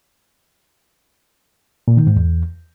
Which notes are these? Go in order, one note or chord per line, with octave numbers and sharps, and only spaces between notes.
A#2
D#3
G#2
E2